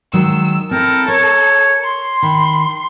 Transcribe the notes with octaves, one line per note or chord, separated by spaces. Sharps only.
D#3 F#3 G#3 E6
C4 E4 A4 A#4
A#4 C#5
C6
D#3 B5